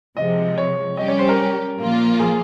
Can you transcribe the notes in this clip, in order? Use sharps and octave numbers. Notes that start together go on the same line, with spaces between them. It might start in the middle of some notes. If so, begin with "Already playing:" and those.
C3 F3 G#3 D#5
C#5
G3 C#4 G4 D#5
C#5
C5
A#4
A#2 F3 A#3 F4
G#4